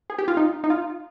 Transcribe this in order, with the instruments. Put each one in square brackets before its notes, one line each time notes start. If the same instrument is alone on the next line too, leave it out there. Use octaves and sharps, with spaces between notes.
[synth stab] G#4
G4
F4
D#4
D#4
F4